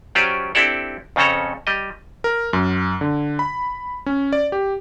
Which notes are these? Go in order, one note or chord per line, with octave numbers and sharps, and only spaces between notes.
F#3 C#4 F4 G4 C5 D5
C4 D4 E4 G4 A4 D5
F2 C#3 C4 C#4 A4 A#5
G3 D#5
A#4
F#2
D3
B5
C#4
D5
G4